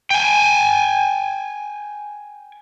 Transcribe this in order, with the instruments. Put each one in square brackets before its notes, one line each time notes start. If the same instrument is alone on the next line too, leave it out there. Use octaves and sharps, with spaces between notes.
[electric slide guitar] G5 G#5